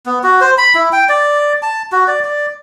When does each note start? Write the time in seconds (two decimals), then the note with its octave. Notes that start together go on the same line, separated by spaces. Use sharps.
0.06 B3
0.24 F#4
0.41 C5
0.58 B5
0.75 E4
0.93 G5
1.09 D5
1.62 A5
1.92 F#4
2.08 D5
2.24 D5